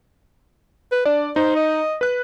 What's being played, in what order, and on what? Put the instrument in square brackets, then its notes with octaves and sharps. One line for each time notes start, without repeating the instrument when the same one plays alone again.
[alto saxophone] B4
[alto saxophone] D4 [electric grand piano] D5
[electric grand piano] D#4 [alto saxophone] C5
[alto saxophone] D#5
[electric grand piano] B4 F#6